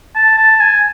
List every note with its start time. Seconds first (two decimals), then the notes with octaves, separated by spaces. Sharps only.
0.16 A5
0.38 A5
0.60 G#5